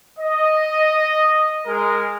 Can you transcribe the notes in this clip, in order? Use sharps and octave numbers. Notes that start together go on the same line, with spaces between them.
D#5
G#3 A#4